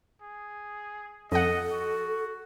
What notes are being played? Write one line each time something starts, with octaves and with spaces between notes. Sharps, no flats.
G#4
F2 A4 D#5 F#5
F#4